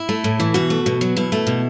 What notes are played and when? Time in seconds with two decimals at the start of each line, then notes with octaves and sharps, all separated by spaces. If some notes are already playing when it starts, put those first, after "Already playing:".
Already playing: E4
0.09 A3
0.24 A2
0.40 E3
0.54 B2 F#4
0.70 A3
0.86 B2
1.01 F#3
1.17 B2 E4
1.32 A3
1.47 B2